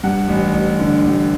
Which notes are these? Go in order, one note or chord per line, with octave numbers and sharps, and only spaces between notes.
G2 F#5
A1
A1
D3
A1